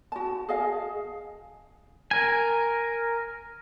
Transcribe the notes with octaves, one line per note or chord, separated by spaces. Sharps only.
F#4 A5
G#4 D#5 F5
A#4 G#5